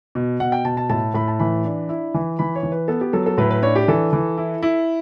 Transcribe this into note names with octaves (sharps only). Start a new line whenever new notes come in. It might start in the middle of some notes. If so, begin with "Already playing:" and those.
B2
B2 F#5
G5
B2 A5
A5
A2 A5
A2 B5
A5
E3 B5
D4
E4
E3
E3 B5
C#5
E3
B4
B3 A4
G4
F#3 A4
A4
A2 B4
B4
D4 C#5
G4
E3 A4
E3
E4
E4